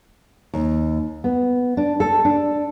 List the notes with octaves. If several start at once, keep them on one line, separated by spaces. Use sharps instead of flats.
D#2
B3
D4
A4
D4